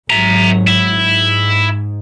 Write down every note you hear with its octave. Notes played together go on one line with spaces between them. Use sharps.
G#1 G#2 F#3 E5 A#5
E4
G#2